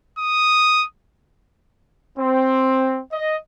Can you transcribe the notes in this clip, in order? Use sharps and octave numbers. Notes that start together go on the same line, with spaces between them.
D#6
C4
D#5